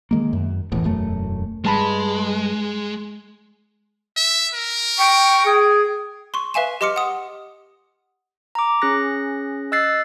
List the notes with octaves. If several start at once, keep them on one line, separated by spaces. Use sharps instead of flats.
D#3 G#3 A#3
F#2
D#1 A1 E2 A2
E1 F#2 A3
G2 G#3 A5 B5
E5
A#4
G5 C#6
G#4
C6 C#6
B4 E5 F5 G#5 E7
G4 D#5 C6 D6 F6 C#7
F#5 D#6
A#5 D6
C#4 G#4 F#6 A#6
D#5 E6 F#6 A6 C7